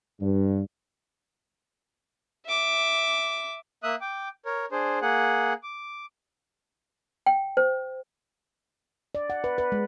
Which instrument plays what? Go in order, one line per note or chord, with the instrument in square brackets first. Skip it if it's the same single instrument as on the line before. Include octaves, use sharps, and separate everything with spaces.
[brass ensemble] G2
[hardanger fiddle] E5 D6
[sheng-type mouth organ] A#3 E5 D#6 F#6
G5 D6
A#4 C#5
D4 G#4 C5
A#3 G#4 F#5
D6
[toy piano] G5
C5
[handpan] D5
F#5
B4
B4
G#3